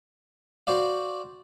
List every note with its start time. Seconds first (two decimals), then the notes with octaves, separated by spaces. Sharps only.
0.67 F#4 C5 D5 F5